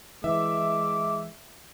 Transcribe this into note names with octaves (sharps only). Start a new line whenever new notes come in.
E3 G#3 E5 D6